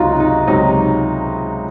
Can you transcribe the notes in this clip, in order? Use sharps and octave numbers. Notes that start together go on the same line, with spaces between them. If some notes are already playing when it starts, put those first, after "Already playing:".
Already playing: C#2 C3 F#3 D#4 F4 F#4
D#4
C#2 C3 F#3 D#4